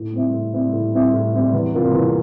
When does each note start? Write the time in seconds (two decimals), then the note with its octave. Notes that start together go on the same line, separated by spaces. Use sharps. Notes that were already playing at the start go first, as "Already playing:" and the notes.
Already playing: A2
0.13 G3 C4 E4
0.34 A2
0.54 G3 C4 E4
0.73 A2
0.93 G3 C4 E4
1.13 A2
1.33 G3 C4 E4
1.53 E2
1.74 C3 G3 A#3 F4
1.93 E2